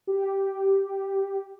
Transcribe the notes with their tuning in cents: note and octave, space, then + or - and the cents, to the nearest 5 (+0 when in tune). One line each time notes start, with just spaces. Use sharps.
G4 -5